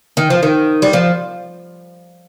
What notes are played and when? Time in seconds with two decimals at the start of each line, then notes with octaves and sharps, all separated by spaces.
0.17 D#3
0.30 F3
0.43 D#3
0.82 G3
0.93 F3